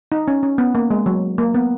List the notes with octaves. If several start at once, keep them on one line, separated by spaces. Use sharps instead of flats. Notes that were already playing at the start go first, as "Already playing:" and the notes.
D#4
C#4
C#4
B3
A#3
G#3
F#3
A#3
B3